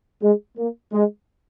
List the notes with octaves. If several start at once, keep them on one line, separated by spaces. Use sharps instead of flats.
G#3
A#3
G#3